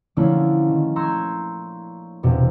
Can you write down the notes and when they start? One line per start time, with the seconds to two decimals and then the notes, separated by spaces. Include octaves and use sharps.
0.16 D3 F3 A3 A#3 C#4 E4
0.68 D#3
0.96 A#5 C6 C#6 E6 G6 G#6
2.23 E1 E2 C3